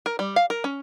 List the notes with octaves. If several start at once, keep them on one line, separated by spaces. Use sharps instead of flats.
A#4
G3
F5
A#4
C#4